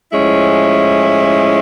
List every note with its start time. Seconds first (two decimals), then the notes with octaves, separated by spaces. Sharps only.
0.12 A2 F3 G#3 C#4 E4